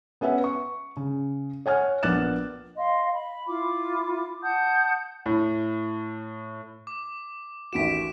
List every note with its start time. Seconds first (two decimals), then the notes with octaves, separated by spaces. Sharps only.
0.21 B3 C#4 B4 E5 F#5
0.44 C#6
0.97 C#3
1.66 C#5 F#5 G#5 F6
2.03 A#1 B3 D6 F#6 A6 E7
2.77 D#5 F5 C6
3.14 B5
3.48 E4 F4 D6
4.42 F#5 A5 D#6 G6
5.26 A2
6.87 D6
7.73 A1 D#2 F#4 B6 D7 E7